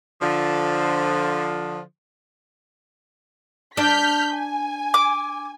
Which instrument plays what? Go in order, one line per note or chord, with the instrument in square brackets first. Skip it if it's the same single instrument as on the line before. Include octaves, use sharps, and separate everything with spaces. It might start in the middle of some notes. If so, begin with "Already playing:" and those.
[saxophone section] D3 F3
[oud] D4 [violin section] F6 G6 B6
[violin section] G#5
[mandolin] D6